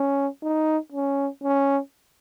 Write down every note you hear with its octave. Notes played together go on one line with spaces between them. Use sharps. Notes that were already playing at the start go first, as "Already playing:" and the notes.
Already playing: C#4
D#4
C#4
C#4